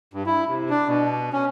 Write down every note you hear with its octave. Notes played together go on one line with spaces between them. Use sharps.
G2
E4
C3
D4
B2
C#4